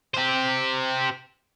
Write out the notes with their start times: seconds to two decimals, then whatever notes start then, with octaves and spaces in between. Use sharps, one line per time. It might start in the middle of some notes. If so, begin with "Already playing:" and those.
0.14 G4 C5